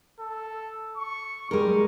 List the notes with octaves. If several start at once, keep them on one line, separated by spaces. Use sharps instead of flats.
A4
C#6
G3 G#3 A#4